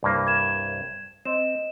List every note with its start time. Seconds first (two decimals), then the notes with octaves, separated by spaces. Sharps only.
0.03 C2 G2 A#3
0.27 G#6 E7
1.25 C4 D#5 E7